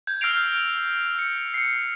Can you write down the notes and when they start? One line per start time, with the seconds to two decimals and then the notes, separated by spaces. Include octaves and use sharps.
0.07 G6 G#6
0.21 E6 F6 A#6 C7 D7 F7
1.19 C#7
1.54 C7 C#7